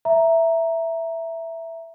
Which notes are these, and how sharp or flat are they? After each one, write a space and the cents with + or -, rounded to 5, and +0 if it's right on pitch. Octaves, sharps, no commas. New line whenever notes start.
E5 +0 A#5 +0